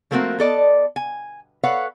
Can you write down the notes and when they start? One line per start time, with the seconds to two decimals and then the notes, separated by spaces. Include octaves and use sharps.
0.11 F3 A3 A#3 C4 F#4 A#4
0.38 B3 A4 D5 D#5
0.96 G#5
1.63 A4 B4 C#5 F5 F#5